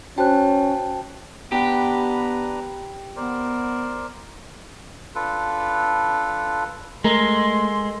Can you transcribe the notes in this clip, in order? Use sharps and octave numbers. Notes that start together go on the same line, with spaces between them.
C#4 F#4 C5 G5 A5 F#6
B3 D4 G4 B4 A#5
B3 A#4 C5 D5
D4 F4 A4 B4
G#3 A3 A4 A#4 C6